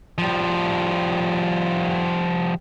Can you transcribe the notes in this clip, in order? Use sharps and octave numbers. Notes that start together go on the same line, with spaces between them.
F3 G3